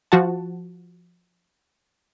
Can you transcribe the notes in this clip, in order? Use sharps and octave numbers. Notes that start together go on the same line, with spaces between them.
F3 F#4 F#5 A5